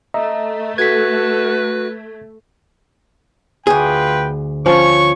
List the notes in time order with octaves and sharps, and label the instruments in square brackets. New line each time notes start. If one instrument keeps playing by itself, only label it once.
[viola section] A3 [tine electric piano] D#5 E5 A#5
[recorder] F#4 [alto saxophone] B4 [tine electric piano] G#6 B6
[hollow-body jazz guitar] D2 G#4 [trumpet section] F4 B4 G5
[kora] F3 C#4 [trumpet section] C#5 C#6